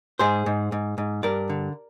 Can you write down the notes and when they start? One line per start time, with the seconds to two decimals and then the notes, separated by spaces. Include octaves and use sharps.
0.19 G#2 G#4 C5
0.46 G#2
0.72 G#2
0.98 G#2
1.23 G2 A#4 D5
1.49 D3